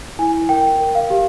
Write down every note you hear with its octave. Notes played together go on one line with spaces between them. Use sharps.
E4 G#5
A#4 G5
A#4
F5
G4